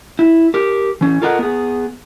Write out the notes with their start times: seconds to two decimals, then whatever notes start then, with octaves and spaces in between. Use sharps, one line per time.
0.19 E4
0.54 G4 A#4
1.01 E3 C#4
1.22 F4 A4 A#4 D#5 F#5
1.39 B3 G#4